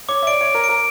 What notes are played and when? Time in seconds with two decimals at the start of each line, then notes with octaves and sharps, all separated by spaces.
0.09 C#5 D6
0.23 E5
0.27 D5 D7
0.41 C#5 D7
0.54 A#4
0.64 D7
0.69 A#4